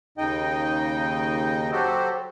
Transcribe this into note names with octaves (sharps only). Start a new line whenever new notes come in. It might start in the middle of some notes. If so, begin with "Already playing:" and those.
D#2 C#3 D#4 D#5 G5
F#3 F#4 G4 A4 C5